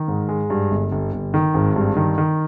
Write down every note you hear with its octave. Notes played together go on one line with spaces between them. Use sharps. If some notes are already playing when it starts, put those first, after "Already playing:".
Already playing: D#3
G#2
G#3
G2
G1
G1
G1
D#3
G#1
G2
D#3
D#3